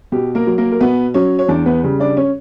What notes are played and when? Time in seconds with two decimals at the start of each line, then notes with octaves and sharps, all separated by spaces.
0.12 B2 G4
0.35 A#3 A#4
0.47 F#3
0.58 A#3 A#4
0.72 A#4
0.80 B2 B3 B4
1.14 F#3 C#4 C#5
1.39 C#5
1.48 E2 D4 D5
1.66 B3 B4
1.83 C#3 G3
2.00 D4 D5
2.17 C#4 C#5